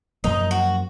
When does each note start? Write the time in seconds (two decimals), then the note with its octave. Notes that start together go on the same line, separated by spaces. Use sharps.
0.24 F#2 F3 A#3 D#4
0.51 F#4